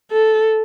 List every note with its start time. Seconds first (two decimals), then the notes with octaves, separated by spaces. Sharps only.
0.11 A4